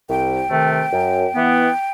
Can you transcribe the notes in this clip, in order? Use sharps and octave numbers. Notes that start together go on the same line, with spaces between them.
C2 G5
C3 D#3 A3
F#2
E3 B3